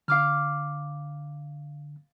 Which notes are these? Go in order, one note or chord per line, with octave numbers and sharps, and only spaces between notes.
D3 F5 D6 F6